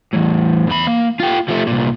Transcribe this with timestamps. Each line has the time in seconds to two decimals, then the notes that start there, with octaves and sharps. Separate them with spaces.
0.13 E2 A2
0.67 E2 B5
0.87 A#3
1.20 F4 G4
1.48 F3 A3
1.67 C2 A#2